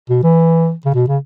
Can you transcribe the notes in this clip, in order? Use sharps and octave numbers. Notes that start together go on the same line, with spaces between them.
B2
E3
C#3
B2
C#3